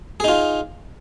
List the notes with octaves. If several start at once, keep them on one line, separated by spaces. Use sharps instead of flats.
D#4 F4 G#4